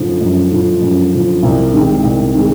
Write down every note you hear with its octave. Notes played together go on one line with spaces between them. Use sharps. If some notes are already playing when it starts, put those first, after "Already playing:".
Already playing: F#2 D3 F3
F#2
D3 F3
F#2
D3 F3
C2
C3 D#3 G#3
C2
C3 D#3 G#3